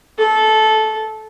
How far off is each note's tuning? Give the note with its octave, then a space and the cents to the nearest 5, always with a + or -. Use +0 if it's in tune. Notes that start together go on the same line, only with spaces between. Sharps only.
A4 -15